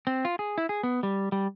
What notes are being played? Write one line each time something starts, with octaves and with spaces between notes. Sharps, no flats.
C4
F4
G#4
E4
G#4
B3
G3
G3